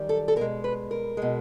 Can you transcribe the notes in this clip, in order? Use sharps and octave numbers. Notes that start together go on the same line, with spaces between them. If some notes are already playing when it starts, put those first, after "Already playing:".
Already playing: F#2 D#3 G3
A4
A4
B2 A#4
G#3
B4
A#4
B2 G#3